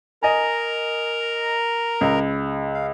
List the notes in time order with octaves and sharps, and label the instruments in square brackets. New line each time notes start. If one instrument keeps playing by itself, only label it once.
[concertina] A#4 A#5 [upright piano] D#5 G#5
[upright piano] C#2
[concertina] F5